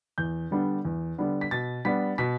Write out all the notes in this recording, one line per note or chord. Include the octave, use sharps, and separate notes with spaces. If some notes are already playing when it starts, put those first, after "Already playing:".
E2 G6
D3 G3 B3 D4
E2
D3 G3 B3 D4
B6
B2 A6
G3 B3 D4 B6
B2 B6